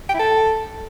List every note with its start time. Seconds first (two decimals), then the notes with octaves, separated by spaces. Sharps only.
0.09 G5
0.14 E4
0.19 A4